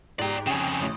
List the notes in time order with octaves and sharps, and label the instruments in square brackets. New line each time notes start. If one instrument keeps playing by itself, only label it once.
[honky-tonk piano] G#2 G4 [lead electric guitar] D5 A#5
[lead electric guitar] F2 C#3 [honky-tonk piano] G5 G#5
[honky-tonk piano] A1 D#6